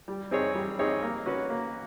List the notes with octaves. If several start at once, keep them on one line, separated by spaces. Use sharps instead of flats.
G3
C4 D#4 G#4 C#5
G3
C4 D#4 G#4 C#5
A#3
C#4 F#4 B4
A#3